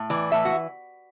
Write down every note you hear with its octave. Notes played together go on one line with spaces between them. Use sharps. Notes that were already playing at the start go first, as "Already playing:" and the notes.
Already playing: A2
E3 D5
A2 E5
F#4